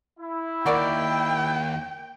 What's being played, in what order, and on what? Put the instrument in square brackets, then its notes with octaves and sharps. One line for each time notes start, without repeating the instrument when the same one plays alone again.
[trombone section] E4
[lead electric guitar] D#2 [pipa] F#4 A#4 D5 [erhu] G5